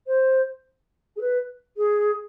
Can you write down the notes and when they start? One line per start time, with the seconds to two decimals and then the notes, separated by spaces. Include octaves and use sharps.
0.07 C5
1.16 G#4
1.21 B4
1.77 G#4